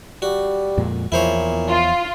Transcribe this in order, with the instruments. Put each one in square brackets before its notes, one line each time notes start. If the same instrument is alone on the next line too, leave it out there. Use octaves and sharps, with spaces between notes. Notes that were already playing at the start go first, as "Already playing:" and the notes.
[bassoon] G3 [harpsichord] F#4
[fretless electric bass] F2 A#2 G#3
[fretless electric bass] E2 F3 [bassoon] A#2 [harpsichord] E4 C5 C#5
[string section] F4